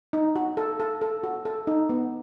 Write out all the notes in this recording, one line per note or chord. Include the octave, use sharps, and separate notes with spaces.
D#4
F#4
A4
A4
A4
F#4
A4
D#4
B3